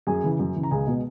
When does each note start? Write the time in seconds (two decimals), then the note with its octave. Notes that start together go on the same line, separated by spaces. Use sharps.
0.07 F#2 G#4 G#5
0.23 C#3 E3
0.39 F#2
0.55 C#3 E3
0.63 A#5
0.71 C#2 G#4 G#5
0.87 B2 G#3 B3